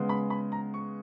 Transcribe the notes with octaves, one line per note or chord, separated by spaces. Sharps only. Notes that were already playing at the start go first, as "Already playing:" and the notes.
Already playing: C#3 G#3 B3
B5
B5
A#5
C#6